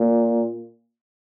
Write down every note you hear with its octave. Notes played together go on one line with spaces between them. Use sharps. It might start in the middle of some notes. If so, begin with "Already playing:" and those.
Already playing: A#2